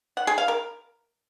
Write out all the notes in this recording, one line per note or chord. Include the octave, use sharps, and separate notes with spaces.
F#5
G#4
F5
A#4